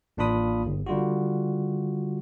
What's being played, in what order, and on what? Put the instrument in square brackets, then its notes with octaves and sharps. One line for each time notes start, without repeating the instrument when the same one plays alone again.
[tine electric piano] A1 A#3 D4 F4 B5 D#6
G1
D3 G3 F4 F#4